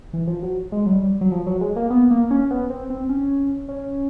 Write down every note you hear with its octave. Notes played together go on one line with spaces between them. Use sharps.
E3
F3
F#3
G#3
F#3
G3
F#3
F3
F#3
G#3
A#3
B3
A#3
C#4
B3
C4
C4
C#4
C#4